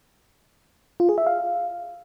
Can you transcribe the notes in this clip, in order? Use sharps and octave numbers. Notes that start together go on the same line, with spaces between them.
F4
G#4
E5
F5